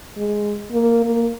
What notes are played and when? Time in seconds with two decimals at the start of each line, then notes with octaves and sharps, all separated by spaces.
0.17 G#3
0.71 A#3
1.05 A#3